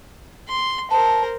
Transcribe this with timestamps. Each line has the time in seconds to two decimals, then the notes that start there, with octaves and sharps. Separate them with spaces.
0.48 C6
0.91 A#4 C5 A5